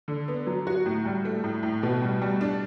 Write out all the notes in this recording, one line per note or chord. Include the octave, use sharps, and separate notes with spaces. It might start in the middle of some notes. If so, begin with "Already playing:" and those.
D3
B3
F#3
F#4
A2
G3
A3
A2
A2
B2
G3
G3
D4